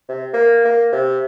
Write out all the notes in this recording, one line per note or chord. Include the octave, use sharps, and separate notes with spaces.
C3
A#3
A#3
C3